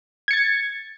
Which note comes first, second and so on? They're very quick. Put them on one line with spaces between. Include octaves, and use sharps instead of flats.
G#6 C#7 A6